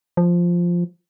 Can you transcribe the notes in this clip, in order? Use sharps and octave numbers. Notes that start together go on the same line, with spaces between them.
F3